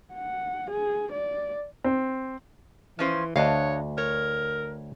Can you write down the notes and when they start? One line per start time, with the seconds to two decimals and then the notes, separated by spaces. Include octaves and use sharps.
0.14 F#5
0.71 G#4
1.12 D5
1.84 C4
2.99 E3 F3 C#4 C5
3.36 D2 D4 C#5 D#5 F5
3.98 A#4 C#5